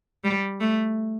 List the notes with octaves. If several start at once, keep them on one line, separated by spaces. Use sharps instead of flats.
G3
A3